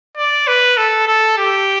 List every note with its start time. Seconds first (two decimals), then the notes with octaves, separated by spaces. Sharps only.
0.17 D5
0.48 B4
0.77 A4
1.07 A4
1.38 G4